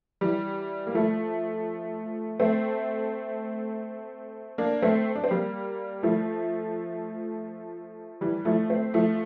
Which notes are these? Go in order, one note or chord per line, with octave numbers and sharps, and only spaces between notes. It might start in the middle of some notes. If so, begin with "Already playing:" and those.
E3 G3
A#3
F3 A3
A3 C4
A#3 D4
A3 C4
D4
C4
G3 A#3
F3 A3
E3 G3
F3 A3
A3 C4
F3 A3